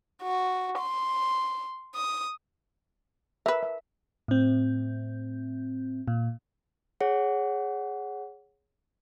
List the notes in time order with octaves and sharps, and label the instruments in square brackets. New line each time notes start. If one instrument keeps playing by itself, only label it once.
[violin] F#4
C6
D#6
[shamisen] A#4 B4 [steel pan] E5
[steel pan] E5
[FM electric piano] A2 C4
A#2
[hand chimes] G#4 C#5 F#5